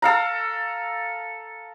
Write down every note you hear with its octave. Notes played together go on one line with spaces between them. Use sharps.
A4 F5 A#5